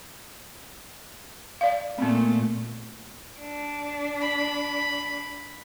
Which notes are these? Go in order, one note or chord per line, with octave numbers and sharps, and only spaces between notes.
D5 F5
A#2 A3 B3 C4
D4
B5